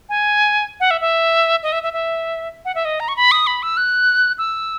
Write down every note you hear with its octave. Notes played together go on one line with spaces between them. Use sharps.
G#5
F#5
E5
E5
D#5
E5
E5
E5
F#5
E5
D#5
A#5
C#6
B5
D#6
B5
E6
F#6
E6